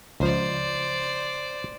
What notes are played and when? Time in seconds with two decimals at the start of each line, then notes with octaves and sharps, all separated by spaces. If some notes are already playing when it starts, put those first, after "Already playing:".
0.20 C#2 F3 C5 D5